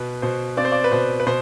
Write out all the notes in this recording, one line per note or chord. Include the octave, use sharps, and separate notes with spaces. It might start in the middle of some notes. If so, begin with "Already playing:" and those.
Already playing: B2 B4
B2 C5
C4 D5
C5
D5
B4
B2 C5
B4
B2 C5